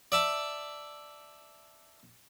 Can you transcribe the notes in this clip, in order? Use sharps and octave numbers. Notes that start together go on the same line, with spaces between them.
D5 E5 A5